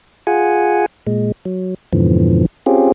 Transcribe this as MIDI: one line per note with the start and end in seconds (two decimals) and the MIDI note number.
0.27 0.86 65
0.27 0.86 68
0.27 0.86 78
0.27 0.86 80
1.07 1.32 46
1.07 1.32 56
1.45 1.75 54
1.93 2.46 41
1.93 2.46 44
1.93 2.46 47
1.93 2.46 50
1.93 2.46 52
1.93 2.46 53
2.66 2.92 60
2.66 2.92 61
2.66 2.92 65
2.66 2.92 67
2.66 2.92 68